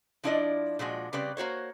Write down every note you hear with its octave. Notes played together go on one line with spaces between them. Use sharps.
F3 D4 E4 F4 D5 D#5
A#2 F3 G#3 F#4
C#3 G3 C4 B4 D5
A#3 F#4 C5 C#5